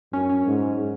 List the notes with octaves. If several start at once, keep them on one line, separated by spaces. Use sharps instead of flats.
F#2 C#4
C#4
G#2